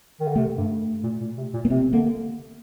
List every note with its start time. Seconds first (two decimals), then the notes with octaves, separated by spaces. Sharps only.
0.20 D#3
0.27 D3
0.36 C3 A3
0.58 G2
1.03 A#2
1.21 A#2
1.38 C3
1.54 A#2
1.65 A#3
1.70 C3 C4
1.93 D3 A#3